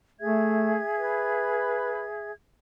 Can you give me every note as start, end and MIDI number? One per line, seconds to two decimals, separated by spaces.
0.20 0.78 57
0.20 2.32 68
0.20 2.32 76
0.20 2.32 92
0.97 2.07 71